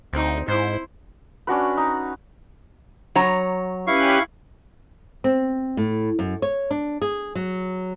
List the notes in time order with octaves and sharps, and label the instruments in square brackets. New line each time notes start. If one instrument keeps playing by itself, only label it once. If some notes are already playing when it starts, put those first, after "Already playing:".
[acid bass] D2 [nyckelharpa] C4 D#4
[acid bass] G#2 [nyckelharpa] E4 C5
[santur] C#4 D4 F#4 B4
D#4
[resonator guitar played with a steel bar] F#3 C#5 A#5
[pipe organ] C#4 G4 B4 [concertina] E4 F5 C#6
[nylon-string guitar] C4
A2
F#2
C#5
D4
G#4
F#3